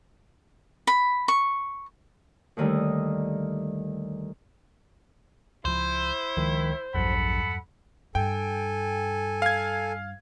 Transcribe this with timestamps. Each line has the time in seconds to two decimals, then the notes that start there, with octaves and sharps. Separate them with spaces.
0.87 B5
1.28 C#6
2.57 D#2 D3 D#3 G3 A3
5.65 C#2 F3 E4 C5
6.37 C#2 D#3 F3 G#3
6.95 A#1 E2 G2 F#3 A4 F#5 B5
8.15 G2 A4 G5 G#5
9.42 F5 G#6